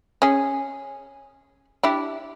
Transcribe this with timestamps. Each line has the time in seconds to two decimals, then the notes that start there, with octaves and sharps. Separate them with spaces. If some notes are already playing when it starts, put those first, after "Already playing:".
0.22 C#4 G#4
1.83 D4 E4 G4